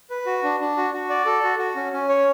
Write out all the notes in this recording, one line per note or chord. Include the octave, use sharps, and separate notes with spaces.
B4
F#4
D4
D4
F#4
F#4
D5
A4
F#4
F#4
C#4
C#4
C#5